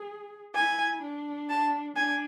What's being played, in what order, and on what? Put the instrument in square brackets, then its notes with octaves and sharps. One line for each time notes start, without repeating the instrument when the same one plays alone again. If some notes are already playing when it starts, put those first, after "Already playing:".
Already playing: [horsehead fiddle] G#4
[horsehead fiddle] E4 [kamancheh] G#5
[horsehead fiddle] D4
[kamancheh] A5
[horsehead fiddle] D4 [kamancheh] G#5